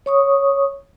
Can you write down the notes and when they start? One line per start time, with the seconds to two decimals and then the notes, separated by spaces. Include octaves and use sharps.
0.06 C#5 C#6 D#6